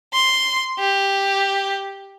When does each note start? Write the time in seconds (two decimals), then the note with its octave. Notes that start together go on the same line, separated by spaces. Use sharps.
0.13 C6
0.79 G4